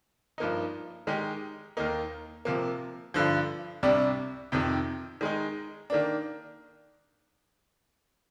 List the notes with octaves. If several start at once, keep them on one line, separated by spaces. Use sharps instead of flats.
G2 F3 A#3 D#4
D#3 G#3 D#4 G4
D#2 D#3 A#3 D#4
C3 F3 A#3
G2 D3 F3
C2 C3 G3 D4
F2 C3 D#3
D#3 G#3 D#4
D#3 A#3 D4